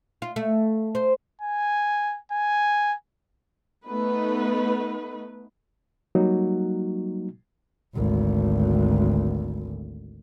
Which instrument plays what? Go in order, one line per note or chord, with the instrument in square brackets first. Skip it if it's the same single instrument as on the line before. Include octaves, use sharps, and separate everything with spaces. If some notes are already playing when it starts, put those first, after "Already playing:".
[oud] F4
A3
C5
[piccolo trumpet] G#5
G#5
[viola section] A3 B3 D#4 B4
[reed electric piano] F#3 G3 A#3 D#4 F#4
[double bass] G#1 D2